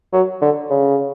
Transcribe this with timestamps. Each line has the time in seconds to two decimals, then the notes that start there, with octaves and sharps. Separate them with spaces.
0.13 F#3
0.42 D3
0.70 C#3